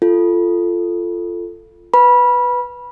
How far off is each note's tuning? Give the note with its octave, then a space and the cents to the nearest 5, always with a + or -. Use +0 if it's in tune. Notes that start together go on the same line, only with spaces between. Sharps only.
F4 -10 A4 +0
B4 +0 B5 -20